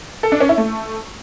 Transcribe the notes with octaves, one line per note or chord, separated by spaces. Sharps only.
A4
D4
C#4
E4
A3